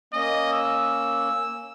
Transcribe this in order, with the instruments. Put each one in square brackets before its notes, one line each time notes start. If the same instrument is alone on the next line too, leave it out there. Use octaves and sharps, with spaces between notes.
[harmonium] A#3 C#4 [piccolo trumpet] D#5
[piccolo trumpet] E6